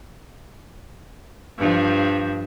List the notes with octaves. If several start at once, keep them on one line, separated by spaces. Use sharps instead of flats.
G2 F3